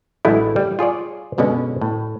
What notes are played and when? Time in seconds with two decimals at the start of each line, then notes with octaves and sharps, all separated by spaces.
0.25 A1 D3 F#3 G#3 A3 E4
0.56 G3
0.79 F4 G#4 C#5 D5
1.38 F#2 B2 D3 G#3 C#4
1.81 A2